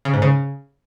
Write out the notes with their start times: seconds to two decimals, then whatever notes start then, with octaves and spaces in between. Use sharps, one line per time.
0.05 C#3
0.14 G#2
0.22 C#3